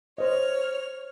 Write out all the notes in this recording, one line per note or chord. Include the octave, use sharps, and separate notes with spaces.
C5 C#5 D#5 F6